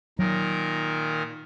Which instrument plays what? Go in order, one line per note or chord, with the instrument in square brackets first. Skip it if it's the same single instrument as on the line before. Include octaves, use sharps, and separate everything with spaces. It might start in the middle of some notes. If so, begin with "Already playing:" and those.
[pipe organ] A#2 D#3 A#4 [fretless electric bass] F#3